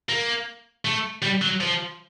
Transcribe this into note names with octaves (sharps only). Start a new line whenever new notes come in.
A#3
A3
G3
F#3
F3